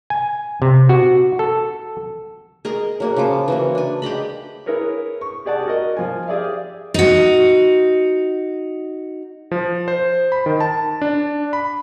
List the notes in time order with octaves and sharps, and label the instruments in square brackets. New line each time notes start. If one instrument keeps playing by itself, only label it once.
[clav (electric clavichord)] G#5
C3
F#4
A4
[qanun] G#4 A#4 D#5
F#3 A#3 G#4
C#3 F3 F4 D6
E3 F#3 A#3
D4 G#5
G4 G#4 D#5 B5
[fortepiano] E4 G#4 A#4 B4 C#5
C#6
G4 G#4 D5 F#5 A5
F#4 A#4 D#5
F3 G#5
G4 G#4 D5 E5 F5
[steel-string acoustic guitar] D#4 F#4
[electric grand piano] F3
C5
B5
D#3
A5
D4
B5